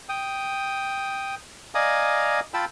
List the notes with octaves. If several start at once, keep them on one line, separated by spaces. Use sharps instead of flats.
G5 D#6
D5 D#5 F5 G#5 A#5 D#6
F4 G5 A5 B5 E6